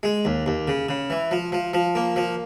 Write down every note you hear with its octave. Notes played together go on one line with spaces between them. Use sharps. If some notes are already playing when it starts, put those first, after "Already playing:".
G#3
D#2
D#2
C#3
C#3
E3
F3
F3
F3
A#3
F3